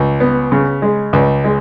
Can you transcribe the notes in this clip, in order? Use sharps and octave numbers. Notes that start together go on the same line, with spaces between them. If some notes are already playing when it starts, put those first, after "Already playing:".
Already playing: C#2
B3
C#3
G#3
C#2
G#3